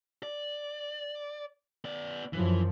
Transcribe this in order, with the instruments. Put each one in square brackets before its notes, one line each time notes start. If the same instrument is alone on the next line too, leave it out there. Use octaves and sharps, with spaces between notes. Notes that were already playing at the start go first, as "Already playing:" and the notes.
[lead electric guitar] D5
B3 D5
[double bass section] F#2 F3 [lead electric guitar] E3